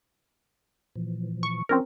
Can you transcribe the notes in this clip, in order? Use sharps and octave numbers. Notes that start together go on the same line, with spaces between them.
A#2 E3 F3
C#6
F3 C4 C#4 F4 A#4